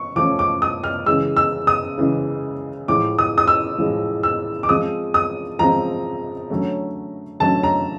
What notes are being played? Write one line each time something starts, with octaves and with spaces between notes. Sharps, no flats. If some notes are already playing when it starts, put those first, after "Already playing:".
Already playing: C#6
F3 A3 C#4 D6
D6
D#6
F6
C#3 E3 G#3 E6
E6
D#6
C#3 E3 G#3
A2 F3 G#3 D6
D#6
D#6
E6
A2 F3 G#3
E6
D6
F3 G#3 C4 D#6
D#6
F3 G#3 C4 A#5
D3 F#3 A3 C#4
D3 F#3 A3 C#4 A5
A#5